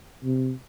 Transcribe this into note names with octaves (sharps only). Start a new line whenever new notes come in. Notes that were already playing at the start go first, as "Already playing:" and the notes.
C3